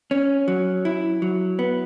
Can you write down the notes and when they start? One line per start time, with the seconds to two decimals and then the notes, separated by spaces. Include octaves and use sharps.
0.11 C#4
0.48 F#3
0.85 E4
1.22 F#3
1.59 B3